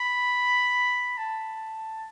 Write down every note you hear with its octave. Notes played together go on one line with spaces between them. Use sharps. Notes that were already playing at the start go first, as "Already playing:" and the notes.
Already playing: B5
A5